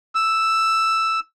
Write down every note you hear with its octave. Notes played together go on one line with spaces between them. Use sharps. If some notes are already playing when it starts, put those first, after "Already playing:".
E6